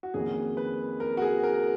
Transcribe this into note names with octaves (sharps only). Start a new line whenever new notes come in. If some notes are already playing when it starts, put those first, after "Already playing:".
F#4
F2 D#3 A#3 C#4 G#4
B4
A#4
F#4
G#4
A#4